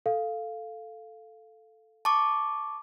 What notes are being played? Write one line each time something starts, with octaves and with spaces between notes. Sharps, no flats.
A4 F5
A5 C#6 D6